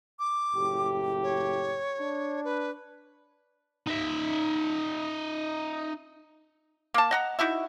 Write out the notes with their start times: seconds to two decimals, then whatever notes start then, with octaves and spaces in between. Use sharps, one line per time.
0.19 D6
0.54 F#1 A2 G4
1.23 C#5
1.99 D4
2.44 B4
3.87 D#4 E5
6.94 A#3 A5
7.11 D#5 F#5 A#5
7.39 D#4 E4 F#4 E5